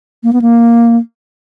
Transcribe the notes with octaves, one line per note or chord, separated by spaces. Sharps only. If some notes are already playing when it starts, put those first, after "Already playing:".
A#3
B3
A#3